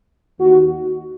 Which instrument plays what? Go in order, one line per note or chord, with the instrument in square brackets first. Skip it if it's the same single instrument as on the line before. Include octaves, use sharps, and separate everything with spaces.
[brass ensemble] D#2 D#3 F#4